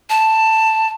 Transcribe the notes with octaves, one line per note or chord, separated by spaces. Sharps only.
A5